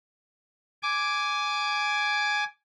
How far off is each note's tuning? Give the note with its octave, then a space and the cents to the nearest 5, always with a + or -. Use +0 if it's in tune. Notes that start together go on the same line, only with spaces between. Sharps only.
G#5 +5 D6 -5